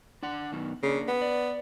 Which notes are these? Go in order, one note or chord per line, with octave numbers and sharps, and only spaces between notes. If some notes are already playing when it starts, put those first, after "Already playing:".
D4 F#5
F#2 B2 D#3
C#3 A#3 D4
B3
D5